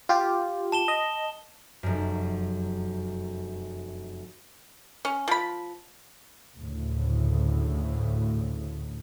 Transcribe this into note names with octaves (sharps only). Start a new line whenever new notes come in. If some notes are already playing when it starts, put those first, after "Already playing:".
F4 G4
A5 E7 G7
D#5
F1 F#2
C#4
F3 B5
D2 A2 C#3